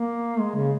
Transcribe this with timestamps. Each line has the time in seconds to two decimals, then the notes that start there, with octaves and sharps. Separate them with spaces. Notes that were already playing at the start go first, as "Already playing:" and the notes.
Already playing: A#3
0.39 G#3
0.55 C#3